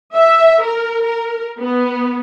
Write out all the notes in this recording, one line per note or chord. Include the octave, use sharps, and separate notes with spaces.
E5
A#4
A#4
B3